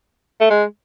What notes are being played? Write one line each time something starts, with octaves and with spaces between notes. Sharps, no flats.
A3
G#3